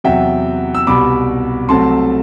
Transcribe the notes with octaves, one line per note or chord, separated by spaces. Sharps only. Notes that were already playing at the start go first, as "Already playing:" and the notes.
E2 C3 F#3 E5 G5
E6
C2 B2 G3 B5 D6
C2 C3 F#3 A3 C4 A5 C6